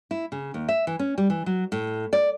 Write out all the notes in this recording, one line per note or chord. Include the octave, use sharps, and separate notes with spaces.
E4
C#3
D#2
E5
E3
C#4
G3
E3
F#3
A2
D5